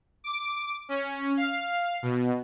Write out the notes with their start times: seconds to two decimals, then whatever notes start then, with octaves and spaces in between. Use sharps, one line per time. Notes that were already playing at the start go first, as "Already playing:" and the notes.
0.24 D6
0.89 C#4
1.37 F5
2.02 B2